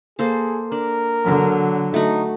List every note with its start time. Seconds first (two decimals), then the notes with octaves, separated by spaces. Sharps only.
0.19 A#3 G#4 A4 C5
0.72 D4 A#4
1.25 D3 F#3
1.94 A3 D#4 F#4